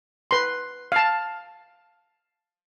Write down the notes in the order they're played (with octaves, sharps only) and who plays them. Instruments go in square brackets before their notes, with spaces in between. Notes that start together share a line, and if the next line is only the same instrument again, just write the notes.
[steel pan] B4 C6
F5 A5